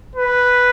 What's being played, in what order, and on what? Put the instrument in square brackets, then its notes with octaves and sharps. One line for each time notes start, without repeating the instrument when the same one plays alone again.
[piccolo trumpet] B4